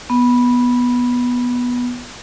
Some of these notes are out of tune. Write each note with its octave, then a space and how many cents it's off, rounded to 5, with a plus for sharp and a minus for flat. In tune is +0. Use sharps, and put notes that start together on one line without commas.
B3 -10